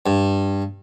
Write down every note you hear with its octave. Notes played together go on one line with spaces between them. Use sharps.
G2